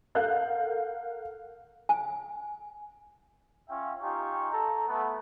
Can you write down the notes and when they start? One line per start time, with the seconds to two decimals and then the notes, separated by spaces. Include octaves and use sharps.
0.15 A4 A#4 F5 F#5 F#6 G6
1.89 G#5
3.69 C#4 F4 E5 G5
4.02 D#4 F4 G4 G#5 C#6
4.52 A4 A#5
4.87 A3 B3